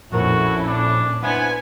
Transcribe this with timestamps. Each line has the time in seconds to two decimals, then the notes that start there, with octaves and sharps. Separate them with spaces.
0.12 A#1 F2 A#2 C#4 E4 F#4 A4 A#4
0.67 D4
1.22 B3 D4 E4 B4 C5 G#5